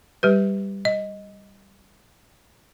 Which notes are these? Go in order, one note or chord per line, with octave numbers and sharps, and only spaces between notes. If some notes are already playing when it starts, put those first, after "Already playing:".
G3 G4 B4
D#5